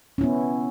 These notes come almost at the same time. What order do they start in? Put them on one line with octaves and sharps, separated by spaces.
C#4 E4 B3